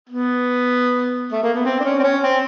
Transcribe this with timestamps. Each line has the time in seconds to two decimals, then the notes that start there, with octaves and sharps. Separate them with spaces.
0.09 B3
1.32 A3
1.43 A#3
1.54 B3
1.65 C4
1.80 D4
1.84 C#4
1.99 C4
2.04 C#4
2.23 C4